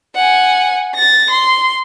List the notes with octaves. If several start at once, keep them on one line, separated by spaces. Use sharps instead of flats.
F#5 G#5
A6 A#6
C6